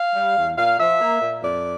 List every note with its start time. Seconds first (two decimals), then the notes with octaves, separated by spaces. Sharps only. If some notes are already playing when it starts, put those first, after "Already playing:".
Already playing: F5
0.15 G3
0.36 E2
0.57 A#2 F5
0.80 F3 E5
1.01 A#3
1.22 A#2
1.43 F2 D5